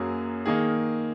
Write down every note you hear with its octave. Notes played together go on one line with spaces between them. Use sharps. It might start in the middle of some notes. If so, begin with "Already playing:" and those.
Already playing: F#2 F#3 A#3 G#4
D#3 A#3 G#4